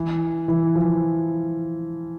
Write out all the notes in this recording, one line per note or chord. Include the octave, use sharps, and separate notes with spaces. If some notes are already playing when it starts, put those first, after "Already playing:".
Already playing: E3
E3
F3